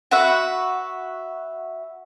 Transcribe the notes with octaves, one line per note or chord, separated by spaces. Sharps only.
F#4 B4 E5